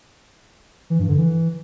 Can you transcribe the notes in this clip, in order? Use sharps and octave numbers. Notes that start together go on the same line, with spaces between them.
E3
G2
D3
E3